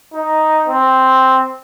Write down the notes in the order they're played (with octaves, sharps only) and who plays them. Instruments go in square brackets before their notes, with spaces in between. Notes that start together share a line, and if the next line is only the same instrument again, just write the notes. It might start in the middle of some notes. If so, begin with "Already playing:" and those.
[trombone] D#4
C4